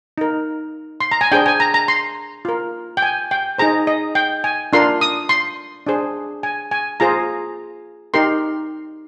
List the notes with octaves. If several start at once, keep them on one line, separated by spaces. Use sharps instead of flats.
D#4 A#4
C6
A#5
G#5
D4 G#4 C5 G5
G#5
A#5
A#5
C6
F4 A#4
G5
G#5
G5
D#4 G#4 C5 A#5
D#5
G5
G#5
D4 F4 A#4 C6
D#6
C6
D4 G#4 C5
G#5
G#5
F4 G#4 C5 A#5
D#4 G4 A#4 C6